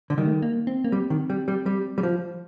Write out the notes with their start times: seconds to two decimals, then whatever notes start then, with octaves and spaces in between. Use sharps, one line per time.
0.10 D3
0.18 D#3 G3
0.25 A3
0.33 G3
0.42 A#3
0.67 C4
0.84 A#3
0.92 G3 C4
1.10 D#3
1.30 G3
1.48 G3
1.66 G3
1.98 G3
2.03 F3